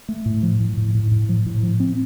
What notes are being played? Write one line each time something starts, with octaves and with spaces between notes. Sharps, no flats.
A3
A2
F3
A2
A2
A2
A2
F3
A2
F3
C4